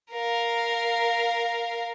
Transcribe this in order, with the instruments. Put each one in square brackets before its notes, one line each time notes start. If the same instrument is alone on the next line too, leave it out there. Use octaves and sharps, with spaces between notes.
[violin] A#4 F5